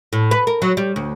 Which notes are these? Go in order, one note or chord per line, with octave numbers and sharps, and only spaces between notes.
A2
B4
A#4
F#3
G3
D2